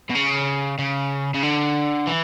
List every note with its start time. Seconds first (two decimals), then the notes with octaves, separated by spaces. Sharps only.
0.10 B2
0.15 C#3
0.79 C#3
1.34 C#3
1.43 D3
2.07 E3